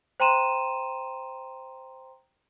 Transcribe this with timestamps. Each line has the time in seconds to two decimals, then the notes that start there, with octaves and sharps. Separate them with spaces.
0.20 C5 G5 A#5 C6 D#7 E7